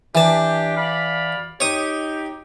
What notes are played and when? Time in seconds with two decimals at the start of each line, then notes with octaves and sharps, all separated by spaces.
0.15 E3 D4 G4 A5
0.76 D5 F5 B5
1.60 D#4 G4 C#5 D#6